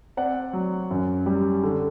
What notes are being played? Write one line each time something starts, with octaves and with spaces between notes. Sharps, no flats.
C4 D5 F#5
F#3
F#2
G3
D3